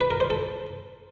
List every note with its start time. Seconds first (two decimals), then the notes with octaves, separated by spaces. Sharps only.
0.01 B4
0.10 A#4
0.20 C5
0.30 A4